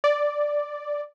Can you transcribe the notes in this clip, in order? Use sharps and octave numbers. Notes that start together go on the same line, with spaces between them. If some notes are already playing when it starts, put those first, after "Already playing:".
D5